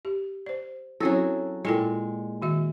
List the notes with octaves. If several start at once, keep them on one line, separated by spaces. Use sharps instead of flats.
G4
C5 D5
F#3 C4 C#4 E4 G#4 A4
A#2 G#3 E4 A4 G5
D#3 F#4 E5